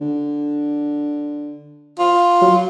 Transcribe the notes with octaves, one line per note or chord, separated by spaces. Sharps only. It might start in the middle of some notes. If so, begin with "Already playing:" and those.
D3
F4
F#3